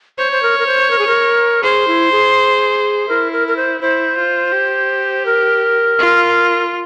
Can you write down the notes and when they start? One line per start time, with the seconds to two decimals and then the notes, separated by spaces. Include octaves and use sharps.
0.18 C5 C#5
0.32 C5
0.43 A#4
0.59 A#4
0.66 C5
0.91 A#4
0.99 G#4
1.07 A#4
1.63 G#4 C5
1.87 E4
2.12 G#4
3.08 E4 A#4
3.32 A#4
3.48 A#4
3.57 C5
3.81 E4 C5
4.17 F4
4.53 G4
5.26 A#4
5.99 F4